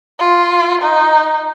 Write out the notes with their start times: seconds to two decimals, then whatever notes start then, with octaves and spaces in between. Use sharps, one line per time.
0.19 F4
0.82 D#4